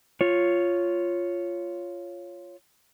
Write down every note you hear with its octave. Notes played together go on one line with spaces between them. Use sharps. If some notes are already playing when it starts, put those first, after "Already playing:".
F4 C#5